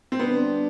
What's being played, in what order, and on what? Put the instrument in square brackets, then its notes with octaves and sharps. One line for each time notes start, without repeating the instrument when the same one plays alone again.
[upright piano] C4
[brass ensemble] D3 G3 D4 [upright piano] B3